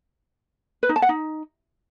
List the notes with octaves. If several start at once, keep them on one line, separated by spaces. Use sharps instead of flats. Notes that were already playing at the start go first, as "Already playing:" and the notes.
B4
D#4
A5
F#5
D#4